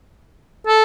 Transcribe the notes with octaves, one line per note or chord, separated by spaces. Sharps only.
A4